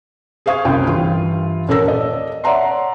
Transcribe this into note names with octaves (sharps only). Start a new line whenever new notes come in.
G#4 C5 F5 C#6 D#6 G#6
F#1 C2 F#2 F4 G5
G2 E3 F4
D#1 C#4 A4 A#4 E6 A#6
D5 D#5
C#5 D5 E5 F#5 A#5 C6